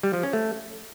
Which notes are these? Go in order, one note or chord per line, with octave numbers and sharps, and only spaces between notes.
G3
F3
C#4
A3